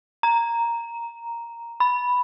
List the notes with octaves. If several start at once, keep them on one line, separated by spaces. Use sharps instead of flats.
A#5
B5